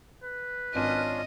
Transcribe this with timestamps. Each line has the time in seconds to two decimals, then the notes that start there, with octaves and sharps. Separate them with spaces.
0.23 B4
0.75 G#1 C#4 D4 F4 D#5 D#7